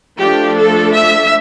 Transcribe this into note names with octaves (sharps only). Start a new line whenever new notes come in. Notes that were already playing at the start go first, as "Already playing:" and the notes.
F3 A3 D4 G4
A4
E5